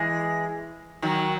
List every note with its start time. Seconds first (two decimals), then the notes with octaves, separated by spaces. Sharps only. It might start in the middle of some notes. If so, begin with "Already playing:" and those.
Already playing: E3 G#3
1.02 D#3 F#3